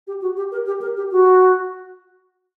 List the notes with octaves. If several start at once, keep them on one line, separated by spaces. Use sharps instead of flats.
G4
F#4
G4
A#4
G4
A#4
G4
F#4